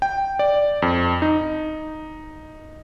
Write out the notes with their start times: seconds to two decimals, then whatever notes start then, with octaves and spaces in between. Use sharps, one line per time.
0.02 G5
0.39 D5
0.82 F2
1.22 D#4